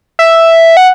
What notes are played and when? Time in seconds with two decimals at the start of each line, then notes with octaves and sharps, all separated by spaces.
0.19 E5
0.77 F#5